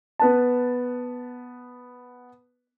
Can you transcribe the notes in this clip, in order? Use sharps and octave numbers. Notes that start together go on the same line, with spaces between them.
B3 B4 A5